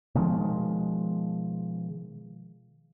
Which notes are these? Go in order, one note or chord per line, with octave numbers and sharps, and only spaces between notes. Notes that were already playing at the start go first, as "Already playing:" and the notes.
B2 D#3 F3 G#3